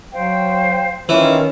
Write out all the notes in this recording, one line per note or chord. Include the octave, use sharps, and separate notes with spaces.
F#3 C5 F5 G5
D#3 E3 C#4 F4